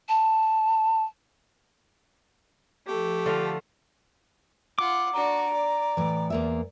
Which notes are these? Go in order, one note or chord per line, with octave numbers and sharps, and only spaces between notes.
A5
F3 A3 G4
D3 F4 F5
F4 F#5 D6
D4 F#4 A#5
D5
A2 E3
E2 A#3 E5